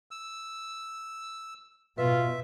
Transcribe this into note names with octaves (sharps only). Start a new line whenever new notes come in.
E6
B2 F4 B4 E5